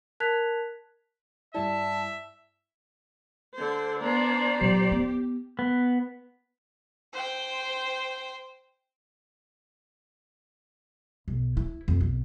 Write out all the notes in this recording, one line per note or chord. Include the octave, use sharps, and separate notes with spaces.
A#4 A5 F#6 G#6 B6 F7
G2 G3 E4 D5 E5 A5
D3 C5
B3 D4 C5 D5 A#5
A#2 F#3 G4
B3
B3
C5 G5
B1
E4
F2
B1